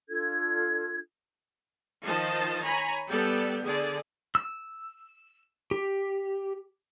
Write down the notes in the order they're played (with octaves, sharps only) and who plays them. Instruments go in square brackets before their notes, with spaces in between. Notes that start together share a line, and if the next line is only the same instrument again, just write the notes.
[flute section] D4 F4 A4 G#6
[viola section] D#3 F3 C5 D#5 A5
C#5 G#5 A#5 B5
G3 B3 A4 D5 G5
D3 G#4 D5
[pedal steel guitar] E6
G4